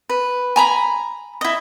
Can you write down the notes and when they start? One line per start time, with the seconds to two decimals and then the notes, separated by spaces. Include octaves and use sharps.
0.10 B4
0.56 G#5 A#5 B5
1.41 E4 D#5